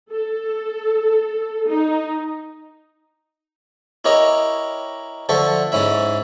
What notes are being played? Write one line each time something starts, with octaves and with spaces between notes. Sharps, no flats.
A4
D#4
E4 G4 A#4 C#5 D#5
D3 F3 A4 E5 C#6
G#2 C#4 E4 E5